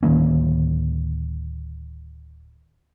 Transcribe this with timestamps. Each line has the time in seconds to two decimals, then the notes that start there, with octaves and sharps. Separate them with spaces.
0.03 D1 D#3 A#3 C#4